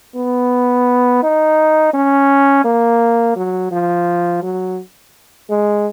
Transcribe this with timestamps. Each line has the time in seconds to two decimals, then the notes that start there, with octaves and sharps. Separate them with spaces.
0.16 B3
1.23 D#4
1.94 C#4
2.64 A#3
3.36 F#3
3.72 F3
4.42 F#3
5.50 G#3